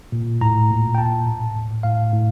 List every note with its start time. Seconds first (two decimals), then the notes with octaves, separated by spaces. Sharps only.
0.12 A#2
0.41 A2 A#5
0.70 A#2
0.95 G5
0.98 A#2 A5
1.26 A2
1.55 A2
1.83 A2 F5
2.13 A2